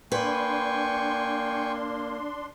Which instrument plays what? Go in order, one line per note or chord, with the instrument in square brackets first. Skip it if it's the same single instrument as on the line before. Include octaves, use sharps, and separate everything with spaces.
[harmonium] A#3 [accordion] D4 C6 [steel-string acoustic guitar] B4 [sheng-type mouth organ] G5 G#5 C#6